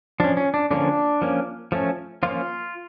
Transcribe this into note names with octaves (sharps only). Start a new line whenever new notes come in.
F3 C#4 D4
C#4
D4
D3 F3 A#3 C#4 D4
F3 A#3 C#4
F3 A3 C#4
F3 A#3 C#4 F4